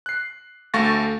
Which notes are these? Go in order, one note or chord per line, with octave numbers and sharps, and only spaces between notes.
F#6 C7
D2 A3 F5 C#6 A6 A#6